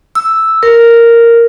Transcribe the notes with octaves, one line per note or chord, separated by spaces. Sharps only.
E6
A#4